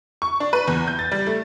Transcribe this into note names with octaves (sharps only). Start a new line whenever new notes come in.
C#6
D4
B4
E2
G6
A6
G3
A3